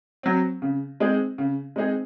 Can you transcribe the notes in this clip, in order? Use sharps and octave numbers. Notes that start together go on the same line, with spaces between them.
F#3 C4
C#3
G#3 C4 D#4 G#4
C#3
G#3 C4 D#4 G#4